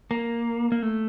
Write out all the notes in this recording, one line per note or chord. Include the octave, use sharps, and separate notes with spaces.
A#3
A#3
A3